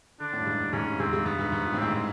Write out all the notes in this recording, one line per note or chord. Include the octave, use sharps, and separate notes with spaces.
D3 D4
A2
G2
G#2
G2
G#2 C#4
G2
G#2 C4
G2
G#2
G2 B3
G#2
G#2
A#2
A2
G#2 C4
A2 C4